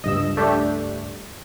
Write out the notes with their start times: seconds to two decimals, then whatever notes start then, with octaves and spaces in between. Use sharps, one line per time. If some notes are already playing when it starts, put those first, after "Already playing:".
0.04 C#2 G2 D#5 E6
0.37 A3 D4 G4